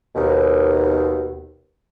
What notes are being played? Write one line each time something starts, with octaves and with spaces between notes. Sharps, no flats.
D#2 B2